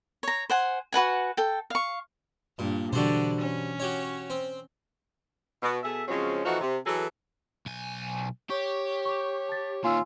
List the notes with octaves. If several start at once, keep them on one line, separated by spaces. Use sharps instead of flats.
C#5 A#5
C5 F#5 G#5
F#4 B4 F#5 G#5
A4 G5
F5 C#6
G2 A#2
B2 D3 E3 G3 F#4 C5
C#4
F#4 G4 C#5
C4
B2
B2 G#4 A4 E5
C#3 F3 F#3 G#3 C4 C#4
E3 F3 A3 D#4 F#4
C3
E3 F#3 G#4 A4
B1 G#5
G4 C#5 C#6
C#6 D6
A5 A6
A#2 D#3 F4 G#5 E6